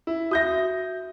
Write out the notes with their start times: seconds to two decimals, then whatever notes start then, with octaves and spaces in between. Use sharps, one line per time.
0.07 E4
0.31 F#4 E5 D#6 G6 A#6